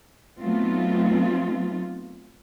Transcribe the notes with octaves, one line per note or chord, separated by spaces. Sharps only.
F#3 A3 B3 C4 D#4 F4